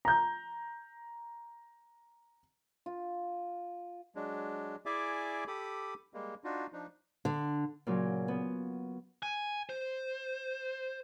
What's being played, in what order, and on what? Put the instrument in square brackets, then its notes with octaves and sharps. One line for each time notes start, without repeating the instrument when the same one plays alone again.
[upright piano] A#5 G6
[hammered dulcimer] F4
[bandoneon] F#3 G#3 D4
E4 G#4 D5 E5 G#5 D6
G4 A4 B5 D6 D#6
G3 G#3 A#3
D4 D#4 F4 F#4
F3 D4 D#4
[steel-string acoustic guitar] D3
[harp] A#2 C#3 F#3
B3
[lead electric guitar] G#5
C5